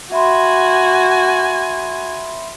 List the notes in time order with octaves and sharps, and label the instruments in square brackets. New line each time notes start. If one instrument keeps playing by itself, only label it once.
[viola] F#4 G#5 [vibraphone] E5 B5 C6